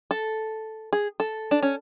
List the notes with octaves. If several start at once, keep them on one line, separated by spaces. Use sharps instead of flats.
A4
G#4
A4
D4
C#4